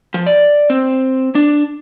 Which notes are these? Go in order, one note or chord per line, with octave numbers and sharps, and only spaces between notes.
F3
D5
C4
D4